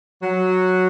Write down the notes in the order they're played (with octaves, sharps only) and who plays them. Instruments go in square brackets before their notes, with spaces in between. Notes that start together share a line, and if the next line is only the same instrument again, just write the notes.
[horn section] F#3